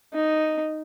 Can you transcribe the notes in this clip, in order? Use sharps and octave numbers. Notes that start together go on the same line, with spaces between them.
D#4